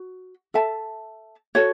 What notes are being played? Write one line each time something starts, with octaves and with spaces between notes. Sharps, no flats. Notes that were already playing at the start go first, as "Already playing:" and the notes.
Already playing: F#4
A4 E5 A5
F#4 A4 C#5